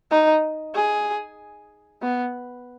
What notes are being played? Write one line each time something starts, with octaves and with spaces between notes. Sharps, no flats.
D#4
G#4
B3